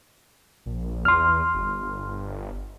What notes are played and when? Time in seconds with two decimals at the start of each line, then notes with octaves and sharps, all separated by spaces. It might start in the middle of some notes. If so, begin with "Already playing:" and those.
0.66 A#1
1.05 E2 C6 F6
1.54 G1